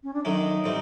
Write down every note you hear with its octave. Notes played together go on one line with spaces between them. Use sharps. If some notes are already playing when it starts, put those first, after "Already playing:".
C#4
D4
F#2 D#3 F#3 A3 D#4
A2 E3 G3 C4